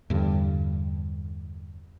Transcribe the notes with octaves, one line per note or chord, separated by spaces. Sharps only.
E2 G2 D3